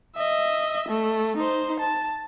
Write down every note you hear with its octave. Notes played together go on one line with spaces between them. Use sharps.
D#5 E5
A3
D#4 C5
A5